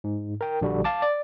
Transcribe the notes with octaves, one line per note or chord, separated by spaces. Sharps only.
G#2
A#4 G5
A#1 D3 G3 F#4
F5 A5 D6
D5